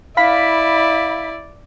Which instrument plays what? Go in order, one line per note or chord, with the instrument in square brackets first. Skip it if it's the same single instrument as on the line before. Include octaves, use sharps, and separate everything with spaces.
[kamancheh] E4 D5 [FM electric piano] F5 B5 B6